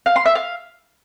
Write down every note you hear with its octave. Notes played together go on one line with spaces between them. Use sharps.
F5
C6
E5
F5